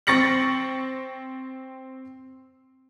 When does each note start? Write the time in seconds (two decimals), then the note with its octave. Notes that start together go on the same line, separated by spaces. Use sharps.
0.07 C4 C#6 A6 A#6 C#7 F#7